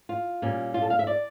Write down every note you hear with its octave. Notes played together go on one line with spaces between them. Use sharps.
F4
A#2 G3 C#4
F4
A4
F5
E5
D5